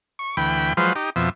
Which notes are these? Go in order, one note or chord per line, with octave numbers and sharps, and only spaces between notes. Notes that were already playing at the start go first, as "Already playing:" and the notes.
C#6
D2 E3 G5 B5
F3 F#3 G#3 F4 B4 C5
D#4 G4
F2 B2 F3 E5